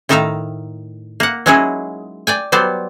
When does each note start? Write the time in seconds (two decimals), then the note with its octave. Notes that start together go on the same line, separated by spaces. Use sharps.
0.09 A2 D#3 D#4 E5 F5 A#5
1.20 A#3 F#5
1.46 F#3 G#3 C#4 D#4 E4 G#4
2.27 D5 G5 G#5
2.52 F#3 G3 B3 C5 D5